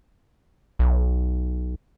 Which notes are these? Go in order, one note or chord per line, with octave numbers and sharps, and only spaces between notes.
B1